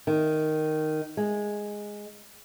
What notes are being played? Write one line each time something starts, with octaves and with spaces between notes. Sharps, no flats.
D#3
G#3